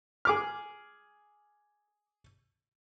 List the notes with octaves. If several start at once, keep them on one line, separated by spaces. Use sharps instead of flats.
G#4 D6 F6